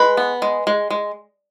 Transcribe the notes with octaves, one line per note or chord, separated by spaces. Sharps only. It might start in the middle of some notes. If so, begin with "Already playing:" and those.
Already playing: G#3 B4 B5
B3
G#3
G#3
G#3